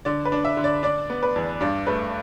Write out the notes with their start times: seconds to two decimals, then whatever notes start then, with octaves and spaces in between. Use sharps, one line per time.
0.05 D3 D5
0.25 B4
0.32 D4
0.45 E5
0.57 D3
0.64 D5
0.83 D4 D5
1.10 B3
1.23 B4
1.36 E2
1.61 G2 D5
1.87 A3 B4